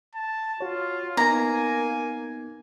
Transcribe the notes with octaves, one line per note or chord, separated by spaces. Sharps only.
A5
F4 F#4 C#5
A#3 B3 D#4 G#5 A#5